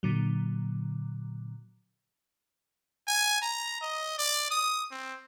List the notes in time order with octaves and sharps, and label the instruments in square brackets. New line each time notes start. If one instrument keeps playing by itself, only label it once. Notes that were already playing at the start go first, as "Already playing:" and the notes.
[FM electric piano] A#2 D3 F#3
[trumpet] G#5
A#5
D#5
D5
D#6
C4